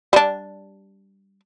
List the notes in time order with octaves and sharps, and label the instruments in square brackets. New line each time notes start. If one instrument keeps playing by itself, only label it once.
[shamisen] G3 D4